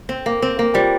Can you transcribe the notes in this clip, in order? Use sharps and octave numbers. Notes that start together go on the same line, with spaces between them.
C4
A#3
C4
A#3
G3 F4 C5 G5